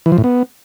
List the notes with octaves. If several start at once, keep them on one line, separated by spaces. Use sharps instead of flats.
E3
F3
A2
B3